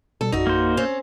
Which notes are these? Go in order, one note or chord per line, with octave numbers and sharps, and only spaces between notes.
B2 G3 A4
A#1 F#2 D#4 F#4
A#3 C5
C4 C#4